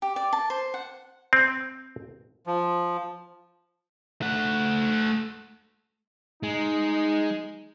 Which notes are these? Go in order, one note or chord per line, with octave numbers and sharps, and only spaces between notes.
G4
D5
A5
C5
F#5
C4
F3
A3 F#5
G#3 D#4